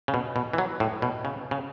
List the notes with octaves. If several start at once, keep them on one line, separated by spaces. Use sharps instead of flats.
C#3
B2
B2
E3
F#3
A2
B2
C#3
C#3